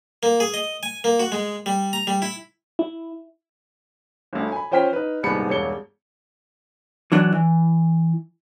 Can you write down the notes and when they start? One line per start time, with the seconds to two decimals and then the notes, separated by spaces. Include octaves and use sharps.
0.23 A#3
0.40 G#4
0.54 D#5
0.83 G#5
1.04 A#3
1.20 F#4
1.32 G#3
1.66 G3
1.93 A#5
2.07 G3
2.22 E4
2.79 E4
4.33 G1 D2
4.52 G#5 B5
4.71 F3 C#4 C5 G5 F6 B6
4.93 D#4 B4
5.23 D#1 C2 G#2 B3 B5 C#7
5.50 E1 G2 C#5 C#7 G7
7.12 E3 F#3 D4
7.33 E3